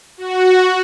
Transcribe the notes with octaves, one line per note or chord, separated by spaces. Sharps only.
F#4